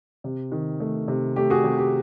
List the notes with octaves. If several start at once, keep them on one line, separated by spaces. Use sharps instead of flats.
C3
D#3
A3
C3
A3 G4
F#4 G#4
C3 G4
G4